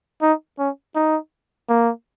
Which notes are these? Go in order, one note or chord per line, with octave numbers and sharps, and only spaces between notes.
D#4
C#4
D#4
A#3